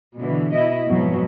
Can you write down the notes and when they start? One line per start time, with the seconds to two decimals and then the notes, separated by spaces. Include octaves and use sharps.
0.19 B2 D3 E3
0.54 B2 E4 D#5
0.88 F2 G#2 B2 F#3